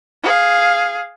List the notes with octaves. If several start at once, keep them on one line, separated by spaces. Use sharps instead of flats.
G#4 F5